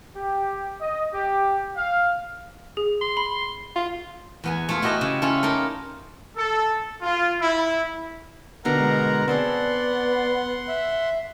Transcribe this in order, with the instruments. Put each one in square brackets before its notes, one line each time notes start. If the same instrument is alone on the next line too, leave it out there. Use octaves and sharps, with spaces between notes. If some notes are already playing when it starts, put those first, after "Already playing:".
[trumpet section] G4
D#5
G4
F5
[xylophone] G#4
[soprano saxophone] C6
[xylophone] B5
[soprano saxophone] F4
[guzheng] E2 B3 G#5
A3 F4 G#4
E4 F#4 G4 D#5 A5 A#5
C#3
C#4 E4 F4 A4
A#3 D#4 A4 A#4
[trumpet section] A4
F4
E4
[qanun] B2 D3 G4 [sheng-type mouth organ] A#4 F#5 A#5
[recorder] G#3
[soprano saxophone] B3 [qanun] C4 G#4 A4 [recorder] D5 [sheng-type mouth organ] F#5 C6
[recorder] E5